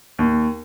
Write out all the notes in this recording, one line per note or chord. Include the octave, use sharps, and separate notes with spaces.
D#2